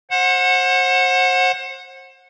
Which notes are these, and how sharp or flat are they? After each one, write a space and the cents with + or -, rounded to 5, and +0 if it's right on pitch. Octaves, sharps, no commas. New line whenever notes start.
C5 +30 F#5 -15